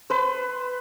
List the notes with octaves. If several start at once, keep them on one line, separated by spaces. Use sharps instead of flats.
B4 C5